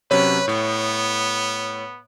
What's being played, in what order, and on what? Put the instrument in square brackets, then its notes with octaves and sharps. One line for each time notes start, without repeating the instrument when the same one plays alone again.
[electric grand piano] C3 F#3 C#4 [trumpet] B4 [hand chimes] C#5
[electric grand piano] A2 [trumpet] B3